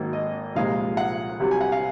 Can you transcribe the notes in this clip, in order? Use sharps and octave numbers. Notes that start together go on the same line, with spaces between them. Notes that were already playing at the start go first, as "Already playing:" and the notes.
Already playing: G#1 G#2 F#3 A#3
D#5
C2 A#2 F3 G#3 F5
F#5
C2 C3 F#3
G#5
F#5
F5